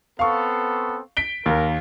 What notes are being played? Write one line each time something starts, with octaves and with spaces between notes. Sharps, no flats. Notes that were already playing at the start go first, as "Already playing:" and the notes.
B3 C4 A4 F5 C#6
B6 D7 G7
D#2 A#4